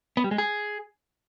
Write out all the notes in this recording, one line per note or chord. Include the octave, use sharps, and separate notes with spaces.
B3
G3
G#3
G#4